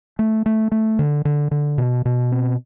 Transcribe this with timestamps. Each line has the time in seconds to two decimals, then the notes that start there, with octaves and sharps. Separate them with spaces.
0.19 A3
0.46 A3
0.72 A3
0.99 D3
1.25 D3
1.51 D3
1.78 B2
2.05 B2
2.32 C4